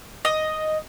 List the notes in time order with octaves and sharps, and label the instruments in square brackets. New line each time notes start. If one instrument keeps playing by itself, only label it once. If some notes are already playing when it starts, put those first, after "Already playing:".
[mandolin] D#5